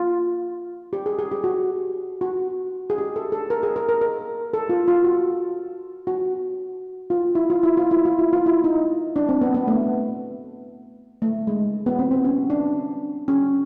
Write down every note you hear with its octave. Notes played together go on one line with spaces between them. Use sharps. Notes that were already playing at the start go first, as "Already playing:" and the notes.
Already playing: F4
G4
G#4
G#4
G4
F#4
F#4
G#4
G4
A4
A4
A#4
G#4
A#4
A#4
A#4
A4
F4
F4
F#4
F#4
F4
E4
F4
E4
F4
E4
F4
E4
F4
E4
D#4
D4
C4
B3
B3
A3
A3
G#3
B3
C4
C4
C#4
D4
C#4